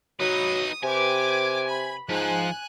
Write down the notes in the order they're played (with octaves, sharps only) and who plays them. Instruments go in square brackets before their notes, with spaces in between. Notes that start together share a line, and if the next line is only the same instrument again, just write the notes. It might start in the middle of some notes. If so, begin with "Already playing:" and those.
[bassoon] F#3 [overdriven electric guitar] D#4 B4 [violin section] D#6
[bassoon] C3 [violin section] G4 B4 D6 [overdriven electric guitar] G#5
[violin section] B5
[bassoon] G#2 [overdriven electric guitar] F3 [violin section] G#5 F#6